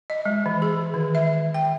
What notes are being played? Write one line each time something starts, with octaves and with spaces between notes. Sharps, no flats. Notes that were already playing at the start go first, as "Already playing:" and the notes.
D#5
G#3
E3
G#4
D#3
E5
G5